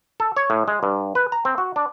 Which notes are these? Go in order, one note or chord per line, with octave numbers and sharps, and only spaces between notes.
A4
C#5
A2
G#3
G2
B4
A#5
C4
F#4
D4